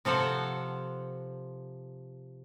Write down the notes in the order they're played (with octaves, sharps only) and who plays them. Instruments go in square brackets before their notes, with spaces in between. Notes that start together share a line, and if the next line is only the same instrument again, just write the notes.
[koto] C3 F3 A4 C5 F#5